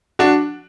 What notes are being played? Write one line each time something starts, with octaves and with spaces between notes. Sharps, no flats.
D4 F#4